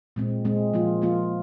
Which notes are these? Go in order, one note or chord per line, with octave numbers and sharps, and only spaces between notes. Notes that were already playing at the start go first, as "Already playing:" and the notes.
A#2 G#3 C4
A#2 G#3 C4
F3 A#3 F4
F3 A#3 F4